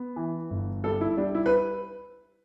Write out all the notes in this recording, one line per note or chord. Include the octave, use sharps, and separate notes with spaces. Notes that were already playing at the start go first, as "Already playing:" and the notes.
Already playing: B3
E3
G1
G3 A4
E4
G3 D4
E4
B4